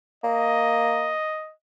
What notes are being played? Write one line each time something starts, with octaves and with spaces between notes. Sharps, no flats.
A#3 D#5